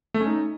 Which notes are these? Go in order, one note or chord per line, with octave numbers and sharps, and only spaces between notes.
A3
C#4
D#4